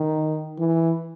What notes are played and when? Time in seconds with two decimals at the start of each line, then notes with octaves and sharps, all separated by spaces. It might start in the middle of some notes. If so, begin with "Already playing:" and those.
Already playing: D#3
0.59 E3